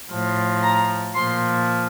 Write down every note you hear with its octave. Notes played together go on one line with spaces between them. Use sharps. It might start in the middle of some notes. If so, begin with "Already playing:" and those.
A2 F3
A#5
A#2 F3 C6